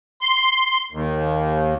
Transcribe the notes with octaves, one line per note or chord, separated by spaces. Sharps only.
C6
D#2